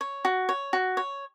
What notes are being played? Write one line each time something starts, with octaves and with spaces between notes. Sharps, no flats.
C#5
F#4
C#5
F#4
C#5